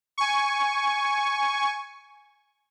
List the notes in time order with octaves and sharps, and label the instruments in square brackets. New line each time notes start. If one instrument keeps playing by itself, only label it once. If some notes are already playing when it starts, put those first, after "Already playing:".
[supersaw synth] G#5 C#6